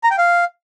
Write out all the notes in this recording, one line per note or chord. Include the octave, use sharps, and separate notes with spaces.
A#5
G5
F5